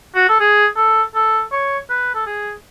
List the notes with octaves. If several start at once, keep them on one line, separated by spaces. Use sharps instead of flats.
F#4
A4
G#4
A4
A4
C#5
B4
A4
G#4